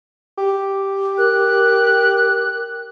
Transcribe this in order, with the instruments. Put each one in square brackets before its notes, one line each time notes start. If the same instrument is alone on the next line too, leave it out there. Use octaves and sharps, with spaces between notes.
[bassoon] G4
[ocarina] A#4 [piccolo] F#6